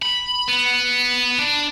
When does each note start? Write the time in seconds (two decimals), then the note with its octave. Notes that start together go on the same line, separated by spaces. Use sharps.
0.02 B5
0.48 B3
1.39 D4